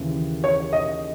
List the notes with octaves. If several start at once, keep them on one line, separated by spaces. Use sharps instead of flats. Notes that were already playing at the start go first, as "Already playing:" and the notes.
Already playing: D#2 C#3 E3
C#5
D#5